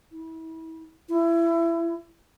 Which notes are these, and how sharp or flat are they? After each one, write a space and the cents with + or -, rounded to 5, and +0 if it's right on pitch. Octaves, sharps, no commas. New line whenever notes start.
E4 -30
E4 +25